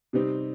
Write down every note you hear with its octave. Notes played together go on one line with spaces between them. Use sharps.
C3 G3 C4 D#4